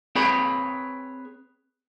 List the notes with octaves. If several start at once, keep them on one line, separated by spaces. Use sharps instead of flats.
C4 G#4 B4 C#5 G5 B5